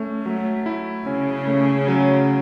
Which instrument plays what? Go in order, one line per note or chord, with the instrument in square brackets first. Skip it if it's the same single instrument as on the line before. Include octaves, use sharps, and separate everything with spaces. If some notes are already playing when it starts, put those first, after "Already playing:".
Already playing: [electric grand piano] A3 C#4
[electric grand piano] F#3 [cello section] A3
[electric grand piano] E4
[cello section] C#3 [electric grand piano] C#4
[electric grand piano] A3
F#3